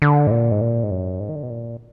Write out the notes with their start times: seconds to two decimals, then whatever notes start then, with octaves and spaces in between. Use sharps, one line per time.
0.02 D3
0.27 G#2
0.31 A#2
0.51 G#2
0.61 A#2
0.83 G#2
0.91 F#2
1.20 G#2
1.29 D#3
1.36 D3
1.43 B2
1.50 A#2